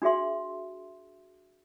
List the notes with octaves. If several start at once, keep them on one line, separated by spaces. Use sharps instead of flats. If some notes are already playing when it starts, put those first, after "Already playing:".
D4 F#4 G#4 E5 C6